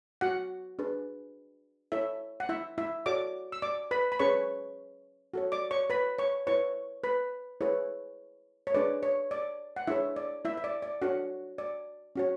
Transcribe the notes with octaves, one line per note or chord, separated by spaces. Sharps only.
F#4 F#5
D4 G#4 B4
E4 A4 C#5 E5
F#5
E4 E5
E4 E5
F#4 A4 C#5 D5 D6
E6
D5 D6
B4 B5
B5
C#4 G#4 B4 C#5 C#6
F#4 A4 C#5
D5 D6
C#5 C#6
B4 B5
C#5 C#6
E4 B4 C#5 C#6
B4 B5
E4 G#4 B4 C#5
C#5
D4 G#4 B4 D5
C#5
D5
F#5
D4 E4 G#4 C#5 E5
D5
E4 E5
E5
D5
D5
D4 F#4 A4 C#5 F#5
D5
C#4 F#4 C#5